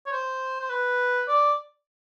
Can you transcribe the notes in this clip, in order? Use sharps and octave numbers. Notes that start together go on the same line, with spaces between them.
C#5
C5
C5
B4
D5